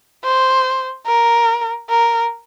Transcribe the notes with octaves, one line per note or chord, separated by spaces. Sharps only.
C5
A#4
A#4